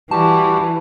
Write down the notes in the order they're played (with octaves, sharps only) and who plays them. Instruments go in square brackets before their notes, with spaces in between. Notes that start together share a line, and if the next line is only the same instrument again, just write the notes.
[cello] E3 [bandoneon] G3 F#4 G4 [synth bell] A5